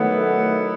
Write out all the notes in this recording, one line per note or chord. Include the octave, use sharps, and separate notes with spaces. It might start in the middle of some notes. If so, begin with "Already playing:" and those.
Already playing: D#3 F#3 A3 B3 E4